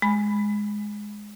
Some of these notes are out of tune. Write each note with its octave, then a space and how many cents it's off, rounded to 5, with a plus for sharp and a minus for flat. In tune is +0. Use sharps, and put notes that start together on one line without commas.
G#3 +0 B5 +0